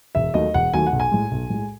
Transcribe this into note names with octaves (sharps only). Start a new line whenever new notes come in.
E1 E5
D#2 D#3 F#3 A3 D#5
E1 F#5
D#2 D#3 F#3 A3 G#5
F#5
B1
G#5
A2 G#3
B1
A2 G#3